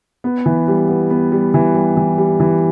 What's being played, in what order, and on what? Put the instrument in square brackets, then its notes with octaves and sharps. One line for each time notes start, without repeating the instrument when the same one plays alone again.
[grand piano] B3
E3
G3
B3
B3
G3
E3
G3
E3
G3
E3